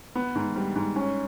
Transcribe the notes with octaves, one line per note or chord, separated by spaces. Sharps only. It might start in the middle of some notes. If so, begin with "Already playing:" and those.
B3
G#2
G3
G#2
C#4